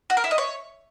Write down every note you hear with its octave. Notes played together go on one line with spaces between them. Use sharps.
F#4
A#4
E4
D#5
C#5